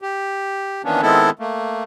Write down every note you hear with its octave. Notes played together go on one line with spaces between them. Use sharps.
G4
D#3 E3 A#3 B3 C#4 D4
D#3 G#3 B3 C4 E4 A4
A3 A#3